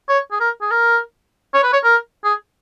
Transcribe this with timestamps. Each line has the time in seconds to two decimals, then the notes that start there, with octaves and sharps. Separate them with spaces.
0.09 C#5
0.31 G#4
0.40 A#4
0.61 G#4
0.71 A#4
1.54 C#5
1.63 B4
1.73 C#5
1.84 A#4
2.24 G#4